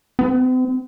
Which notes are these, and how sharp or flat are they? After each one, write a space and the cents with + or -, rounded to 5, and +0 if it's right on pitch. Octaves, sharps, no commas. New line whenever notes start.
C4 -45